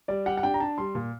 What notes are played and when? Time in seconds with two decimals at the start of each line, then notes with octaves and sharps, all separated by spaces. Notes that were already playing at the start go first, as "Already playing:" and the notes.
0.08 G3 D5
0.26 G4 F#5
0.37 F#5
0.43 D4 G5
0.54 A#5
0.60 D4 A5
0.78 G3 C6
0.95 A#2